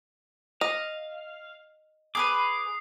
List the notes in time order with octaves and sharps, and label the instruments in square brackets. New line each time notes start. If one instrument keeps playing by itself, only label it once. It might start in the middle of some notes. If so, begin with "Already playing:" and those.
[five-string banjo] D#5 [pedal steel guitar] F5
[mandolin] G#4 A#4 B4 [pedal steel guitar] D6 [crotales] D#6 C7